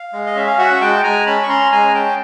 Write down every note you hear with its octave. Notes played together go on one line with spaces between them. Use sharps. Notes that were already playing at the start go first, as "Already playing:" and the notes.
Already playing: F5
G#3
D#5
C#4 E5
F5
F#4 E5 F#5
G#3 G5 A5
G#3 G#5 A#5
C#4 A5 B5
C#6
C#4 A#5 C6
G#3 G#5 A#5
C#4 G5 A5